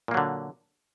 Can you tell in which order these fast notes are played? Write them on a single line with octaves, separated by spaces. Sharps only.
A#2 A#3 F#3 D3